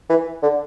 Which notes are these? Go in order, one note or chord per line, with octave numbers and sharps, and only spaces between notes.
E3
D3